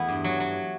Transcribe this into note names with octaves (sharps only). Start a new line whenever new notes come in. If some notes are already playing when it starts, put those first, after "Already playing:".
Already playing: E2 A3 B3 E4
G2
F#3
F#3